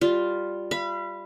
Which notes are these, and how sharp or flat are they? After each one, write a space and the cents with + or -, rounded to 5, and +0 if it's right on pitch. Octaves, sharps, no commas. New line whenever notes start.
G3 +0 F4 +0
F5 -40 B5 +0